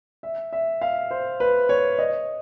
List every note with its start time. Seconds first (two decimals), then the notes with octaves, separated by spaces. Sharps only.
0.23 E5
0.53 E5
0.81 F5
1.11 C5
1.40 B4
1.69 C#5
1.98 D#5